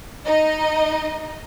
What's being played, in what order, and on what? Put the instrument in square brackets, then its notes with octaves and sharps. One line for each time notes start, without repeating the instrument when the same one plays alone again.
[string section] D#4 D#5